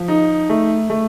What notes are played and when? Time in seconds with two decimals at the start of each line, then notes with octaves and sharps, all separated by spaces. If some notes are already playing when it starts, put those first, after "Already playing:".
Already playing: F3
0.08 D#4
0.50 A3
0.90 A3